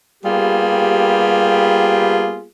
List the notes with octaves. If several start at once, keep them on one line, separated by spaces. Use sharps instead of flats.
G3 A#3 B3 F4 G4 G#4